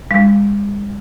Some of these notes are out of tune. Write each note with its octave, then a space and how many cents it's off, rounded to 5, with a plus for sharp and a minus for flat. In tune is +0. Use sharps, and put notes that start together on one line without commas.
G#3 -40 F5 -15